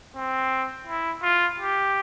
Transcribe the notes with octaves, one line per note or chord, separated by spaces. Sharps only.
C4
E4
F4
G4